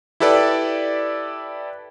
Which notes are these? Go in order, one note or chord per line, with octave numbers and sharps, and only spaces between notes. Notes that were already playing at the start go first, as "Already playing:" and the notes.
E4 G4 A4 B4 D5